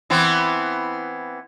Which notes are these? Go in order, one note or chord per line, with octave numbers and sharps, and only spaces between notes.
E3 B3 C4